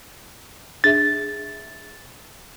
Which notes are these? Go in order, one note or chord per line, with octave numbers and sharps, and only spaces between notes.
D4 G#4 E5 A6